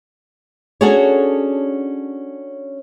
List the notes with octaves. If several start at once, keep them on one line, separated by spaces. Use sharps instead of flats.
C#4 D4 F#4 G#4 A4 C#5